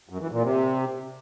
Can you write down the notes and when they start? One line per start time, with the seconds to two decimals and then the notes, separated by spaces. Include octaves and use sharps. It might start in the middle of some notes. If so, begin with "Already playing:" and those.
0.09 F#2
0.21 E3
0.32 A#2
0.43 C3